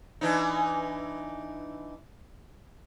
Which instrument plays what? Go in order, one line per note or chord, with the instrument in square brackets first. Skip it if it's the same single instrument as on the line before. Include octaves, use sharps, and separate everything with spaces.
[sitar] E3 D4 D#4